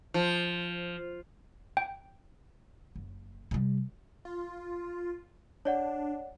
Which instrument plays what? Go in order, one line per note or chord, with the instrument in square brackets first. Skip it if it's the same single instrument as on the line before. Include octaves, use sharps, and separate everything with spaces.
[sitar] F3
[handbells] G5
[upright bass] F#1
C3 G3
[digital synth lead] F4
[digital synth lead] D4 [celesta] C#5 D5 F#5